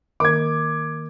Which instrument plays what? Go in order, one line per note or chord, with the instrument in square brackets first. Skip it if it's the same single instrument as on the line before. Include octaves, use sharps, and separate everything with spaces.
[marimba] D#3 A#3 A#4 [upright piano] D6 G#6